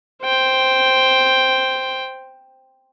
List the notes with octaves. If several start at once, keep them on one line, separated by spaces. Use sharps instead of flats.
C5 G5